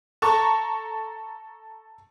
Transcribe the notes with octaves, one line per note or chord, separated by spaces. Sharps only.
A4 A5 A#5 C#6